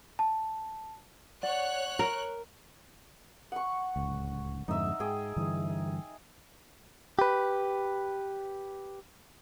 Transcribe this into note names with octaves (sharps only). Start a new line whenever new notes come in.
A5
C#5 D5 F#5 F#6
A#4
F#5 C#6
D1 C#2
F2 G#2 D3 D#4 E5
G#2 G#4 G5
G2 D3 E3
G4 B4